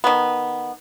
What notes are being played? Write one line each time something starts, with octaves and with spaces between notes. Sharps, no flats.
D#3 B3